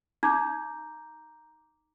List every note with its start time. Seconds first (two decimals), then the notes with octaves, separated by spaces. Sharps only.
0.23 D#4 A#5 D6 G6